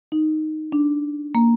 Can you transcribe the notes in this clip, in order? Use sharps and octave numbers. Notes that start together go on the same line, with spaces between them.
D#4
D4
A#3